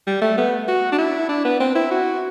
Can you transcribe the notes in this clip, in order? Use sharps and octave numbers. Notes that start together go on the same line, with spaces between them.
G3
A3
B3
F#4
D4
E4
D4
B3
C4
E4
F#4